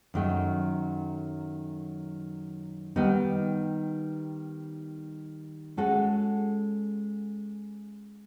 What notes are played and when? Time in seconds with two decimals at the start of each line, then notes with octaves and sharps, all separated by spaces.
0.14 F#2 D#3 F#3 A3
2.96 D#3 G3 B3 D#4
5.77 G#3 C#4 F#4 A4